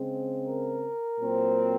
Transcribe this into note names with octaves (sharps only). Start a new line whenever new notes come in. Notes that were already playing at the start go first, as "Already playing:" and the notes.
Already playing: C#3 G#3 C4
A#4
A#2 F#3 C4